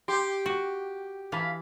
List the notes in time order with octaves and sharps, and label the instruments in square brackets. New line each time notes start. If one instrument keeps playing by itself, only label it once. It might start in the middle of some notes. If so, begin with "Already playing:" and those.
[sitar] G4 [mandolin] C6
[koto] F#4
[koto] E3 [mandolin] F5 A5 B5